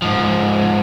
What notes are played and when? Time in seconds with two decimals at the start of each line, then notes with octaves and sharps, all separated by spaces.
0.02 G#2 F3